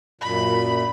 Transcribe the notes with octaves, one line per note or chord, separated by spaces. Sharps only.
F#2 A#2 B5